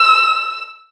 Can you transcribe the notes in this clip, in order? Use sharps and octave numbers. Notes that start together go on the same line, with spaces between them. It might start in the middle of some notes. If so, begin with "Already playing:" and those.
Already playing: E6